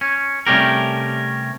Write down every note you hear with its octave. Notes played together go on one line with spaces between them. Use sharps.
C#4
C3 G3 A3 C#4 G4 A#4